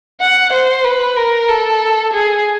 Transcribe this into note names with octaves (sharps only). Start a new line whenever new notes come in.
F#5
C5
B4
A#4
A4
G#4